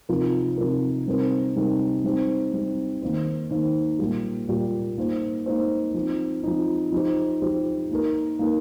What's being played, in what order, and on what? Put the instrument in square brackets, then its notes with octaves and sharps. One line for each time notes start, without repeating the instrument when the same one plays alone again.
[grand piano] C3 F3 D#4 A#4
C3 F3 D#4 A#4
C3 G3 C4 D#4 A#4
C3 G3 C4 D#4 A#4
G3 C4 D#4
G3 C4 D#4
D#3 A#3 D#4 C5
D#3 A#3 D#4 C5
A#2 G3 A#3 G4
A#2 G3 A#3 G4
A#3 D#4 C5
A#3 D#4 C5
F3 C4 D#4
F3 C4 D#4
F3 D#4 G4 C5
F3 D#4 G4 C5
A#3 D#4 A#4
A#3 D#4 A#4